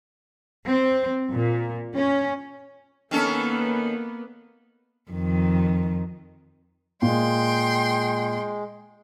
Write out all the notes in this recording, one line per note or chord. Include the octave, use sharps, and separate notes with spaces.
C4
A#2
C#4
D#3 A#3 B3 C#4 A4
F2 D#3
A#2 G#3 G5 C6